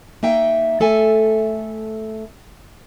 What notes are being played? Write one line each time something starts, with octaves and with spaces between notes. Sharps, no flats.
A#3 D#4 E5 G5
A3 A4 E5 G#5